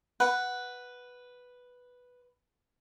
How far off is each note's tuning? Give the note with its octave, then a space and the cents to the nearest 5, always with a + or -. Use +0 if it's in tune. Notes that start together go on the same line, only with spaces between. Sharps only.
B4 +0 F#5 +0